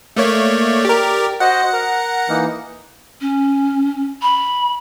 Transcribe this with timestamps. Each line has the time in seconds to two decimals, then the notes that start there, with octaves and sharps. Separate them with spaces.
0.16 A3 A#3 C#5 D5
0.85 G4 A#4
1.40 F#4 C5 D#5 F#5
1.73 A#4 A#5
2.29 E3 A#3 D#4
3.21 C#4
4.22 B5